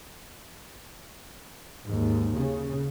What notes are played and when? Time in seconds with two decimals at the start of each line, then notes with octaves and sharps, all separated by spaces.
1.84 D#2 G#2
2.37 C#3